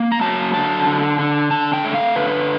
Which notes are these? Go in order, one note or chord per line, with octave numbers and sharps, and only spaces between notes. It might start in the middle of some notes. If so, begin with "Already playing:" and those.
Already playing: A#3
A#5
F#3 A5
D3 A5
D3
D3
D3 A5
G5
A3
F5
D3 B4